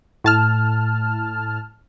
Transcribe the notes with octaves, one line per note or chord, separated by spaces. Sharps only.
A2 A5 F6